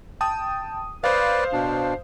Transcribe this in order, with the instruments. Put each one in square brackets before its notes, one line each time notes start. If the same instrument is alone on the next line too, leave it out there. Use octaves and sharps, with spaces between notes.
[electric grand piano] G5 A5 D#6
[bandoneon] B4 D5 [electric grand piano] C5 F5
[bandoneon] B2 D4